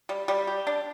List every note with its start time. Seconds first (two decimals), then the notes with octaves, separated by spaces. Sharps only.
0.09 G3
0.28 G3
0.47 G4
0.67 D4